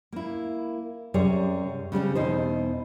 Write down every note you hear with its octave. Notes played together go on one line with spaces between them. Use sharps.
A#3 E4
F#2 C3 G3 G#4 C#5
C#3 G3 C4 C#4
E2 B2 D#4 C5